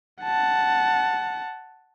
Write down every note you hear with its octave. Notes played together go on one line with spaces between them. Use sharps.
F#5 A5